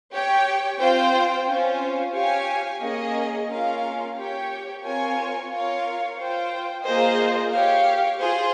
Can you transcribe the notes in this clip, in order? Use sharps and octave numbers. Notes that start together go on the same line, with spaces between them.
G4 C#5 G5
C4 F4 C5 G5
C#4 F4 C5
G4 C#5 F5 G#5
A#3 C#4 G#4 D#5
A#3 C#4 F4 A#4 F5
G4 C#5 G5
C4 F4 A#4 C#5 G#5
F4 A#4 C#5 F5
F4 C5 G5
A#3 F4 G#4 C5 D#5
G4 C#5 F5
F4 G#4 C5